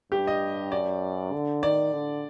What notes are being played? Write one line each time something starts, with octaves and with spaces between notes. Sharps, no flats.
G2 G4
D#5
F#2 D5
D3
D#3 D5
D3